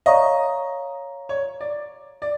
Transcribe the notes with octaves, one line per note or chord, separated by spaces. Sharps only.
C#5 D#5 F5 A#5 C#6
C#5
D5
D5